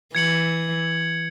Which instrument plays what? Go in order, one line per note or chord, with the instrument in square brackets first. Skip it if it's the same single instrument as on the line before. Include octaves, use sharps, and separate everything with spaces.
[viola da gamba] E3 [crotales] G#6 C#7 F#7